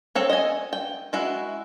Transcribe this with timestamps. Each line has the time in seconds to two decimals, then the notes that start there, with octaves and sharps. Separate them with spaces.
0.15 C4 A4 C#5
0.30 D#5 G#5
0.73 G5
1.13 G#3 E4 F#4